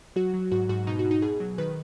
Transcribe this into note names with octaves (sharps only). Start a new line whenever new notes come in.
F#3 F#4
F#3
G#2 F#4
G#2 F#4
B2 D#4
F#4
B2
D#4
B2 G#4
F#3
D#3 B4